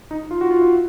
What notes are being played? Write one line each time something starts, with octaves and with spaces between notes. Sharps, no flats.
D#4
F4
F#4
F4
E4